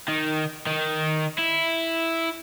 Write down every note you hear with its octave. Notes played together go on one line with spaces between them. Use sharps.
D#3
D#3
E4